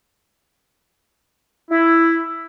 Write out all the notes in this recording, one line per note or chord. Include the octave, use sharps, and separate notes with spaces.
E4